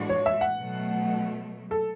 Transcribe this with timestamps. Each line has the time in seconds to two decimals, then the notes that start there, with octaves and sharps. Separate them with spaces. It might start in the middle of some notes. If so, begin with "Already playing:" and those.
Already playing: A2 E3 G#3 D4 F#4
0.10 C#5
0.26 E5
0.41 F#5
0.58 B2 F#3 A3
1.71 A4